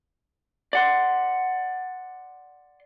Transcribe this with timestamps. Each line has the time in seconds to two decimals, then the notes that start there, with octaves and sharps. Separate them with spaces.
0.73 D5 F#5 C6